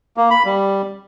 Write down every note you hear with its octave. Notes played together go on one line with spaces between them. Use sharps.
A#3
B5
G3